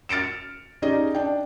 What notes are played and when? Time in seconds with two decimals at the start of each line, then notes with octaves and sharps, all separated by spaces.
0.09 F6 A6 C#7 D7 E7
0.82 C#4 D#4 G4 G#4 D5 D#5
1.15 D4 G5